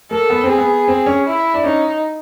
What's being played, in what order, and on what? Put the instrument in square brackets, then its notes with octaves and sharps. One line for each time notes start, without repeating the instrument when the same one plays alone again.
[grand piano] A#3 [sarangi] A4
[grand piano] B3
C4
[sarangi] G#4
[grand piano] B3
C4
C#4
[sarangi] E4
[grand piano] D4
[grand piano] C#4 [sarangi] D#4